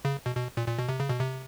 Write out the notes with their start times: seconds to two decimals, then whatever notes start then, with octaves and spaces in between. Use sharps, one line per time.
0.05 C#3
0.26 B2
0.36 B2
0.57 A#2
0.68 A#2
0.79 B2
0.89 C3
1.00 C#3
1.09 B2
1.20 C3